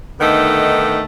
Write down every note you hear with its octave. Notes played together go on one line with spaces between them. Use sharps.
D3 D#3 A3 B3 D#4